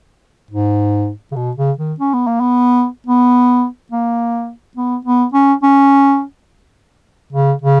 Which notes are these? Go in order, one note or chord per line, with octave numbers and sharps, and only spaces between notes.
G#2
C#3
B2
C#3
D#3
C#4
B3
A#3
B3
B3
A#3
B3
B3
C#4
C#4
C#3
C#3